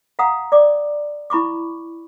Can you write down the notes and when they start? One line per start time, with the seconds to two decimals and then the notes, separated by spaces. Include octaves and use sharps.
0.19 F5 F#5 A#5 D#6
0.52 D5 D6
1.30 E4 B5 C#6 D6